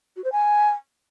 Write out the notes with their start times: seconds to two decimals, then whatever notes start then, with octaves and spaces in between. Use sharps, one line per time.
0.16 F#4
0.24 C5
0.32 G#5